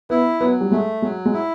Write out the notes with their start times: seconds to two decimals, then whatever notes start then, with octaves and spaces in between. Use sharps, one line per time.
0.10 B3 E4
0.40 F#3 B3
0.61 G3
0.72 G#3 A3
1.02 F#3 G#3
1.26 G#3
1.33 E4